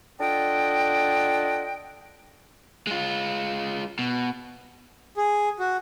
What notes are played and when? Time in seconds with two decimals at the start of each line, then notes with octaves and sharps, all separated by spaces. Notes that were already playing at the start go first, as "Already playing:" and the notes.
0.21 D4 F4 A4 D#5 F#5 G5
2.87 G#3 F4
3.99 B2
5.17 G#4
5.59 F#4